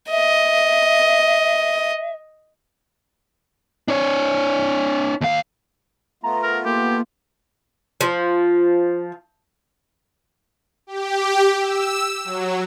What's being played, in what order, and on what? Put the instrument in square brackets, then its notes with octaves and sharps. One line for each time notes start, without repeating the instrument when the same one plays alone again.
[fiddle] D#5 [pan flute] E5
[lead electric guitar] D4 C#5
D#2 F5
[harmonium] A3 B3 F4 [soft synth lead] A#5
[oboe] A#4
[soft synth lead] A#3 [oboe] G4
[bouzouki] F3
[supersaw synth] G4
E6
F#3